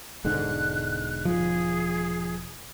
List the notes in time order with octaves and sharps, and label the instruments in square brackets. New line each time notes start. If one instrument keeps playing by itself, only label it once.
[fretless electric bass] E1 G#2 D3 [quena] F#6
[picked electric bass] F3 [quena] G#4